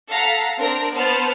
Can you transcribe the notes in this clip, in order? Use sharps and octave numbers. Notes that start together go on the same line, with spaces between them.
A4 F5 F#5 A#5 B6
C4 D4 A#4 A#6
B3 C5 A5 F6